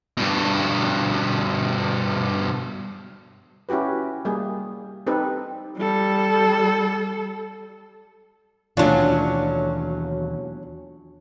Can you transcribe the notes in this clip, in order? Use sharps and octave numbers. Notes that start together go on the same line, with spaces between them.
G2 B2
C#4 E4 F#4 G4 B4
G3 A#3 G#4
C4 D#4 G4 A4 B4
G3 A4
D#2 B2 E3 F#3 A3 C#4 D4 F4